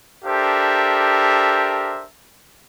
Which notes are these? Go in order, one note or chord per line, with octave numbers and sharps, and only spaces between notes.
D4 G4 A4 A#4 C5 E5